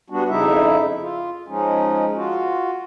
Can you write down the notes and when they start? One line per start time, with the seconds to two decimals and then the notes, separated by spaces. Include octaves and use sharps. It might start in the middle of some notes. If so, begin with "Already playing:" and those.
0.10 G3 B3 D4 F#4
0.29 F2 C#3 D#4 E4 E5
1.00 F4
1.48 F3 G#3 C#4 D#4
2.15 F4 F#4